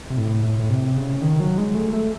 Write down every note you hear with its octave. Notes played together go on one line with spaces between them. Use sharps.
C3
A2
A2
A2
C3
C#3
D#3
F#3
G#3
A3
A3